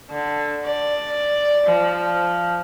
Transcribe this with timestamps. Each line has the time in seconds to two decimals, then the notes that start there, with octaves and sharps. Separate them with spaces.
0.11 D3
0.65 D5
1.66 F3